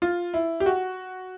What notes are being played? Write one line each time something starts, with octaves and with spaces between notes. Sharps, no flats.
F4
E4
G4
F#4